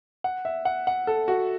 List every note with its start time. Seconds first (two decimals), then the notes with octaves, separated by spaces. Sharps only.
0.24 F#5
0.45 E5
0.65 F#5
0.87 F#5
1.07 A4
1.28 F#4